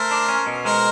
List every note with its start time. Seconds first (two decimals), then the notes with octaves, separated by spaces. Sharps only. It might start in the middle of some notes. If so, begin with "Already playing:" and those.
Already playing: A3 A#4 C5
0.11 D4
0.29 C#4
0.46 B2
0.65 G#3 A#4 C5